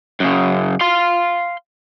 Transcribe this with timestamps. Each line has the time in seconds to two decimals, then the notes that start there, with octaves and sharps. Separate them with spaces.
0.20 F#2 C#3
0.81 F5 C6